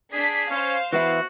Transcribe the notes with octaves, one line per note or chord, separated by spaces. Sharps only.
D4 G#4 B6
C#4 C5 F5
E3 B3 E4 F#4